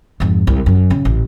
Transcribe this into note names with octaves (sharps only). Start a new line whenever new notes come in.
F2 G#2
C2
F#2
C#3
A1